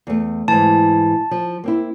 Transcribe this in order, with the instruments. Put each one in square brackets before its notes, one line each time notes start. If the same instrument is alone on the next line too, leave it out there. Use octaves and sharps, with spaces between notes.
[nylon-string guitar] E2 A3
[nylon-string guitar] G#2 E3 [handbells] A5
[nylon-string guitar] F3
A#3 C4 E4